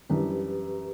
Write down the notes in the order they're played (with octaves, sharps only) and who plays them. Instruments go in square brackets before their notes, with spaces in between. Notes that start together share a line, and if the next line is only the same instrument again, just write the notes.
[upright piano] F#2 E3 G3 D4 [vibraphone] G4 B4